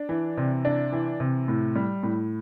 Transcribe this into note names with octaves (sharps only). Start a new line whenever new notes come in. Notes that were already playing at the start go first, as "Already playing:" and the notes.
Already playing: D4
E3
C3
D4
E3
C3
A2
G3
A2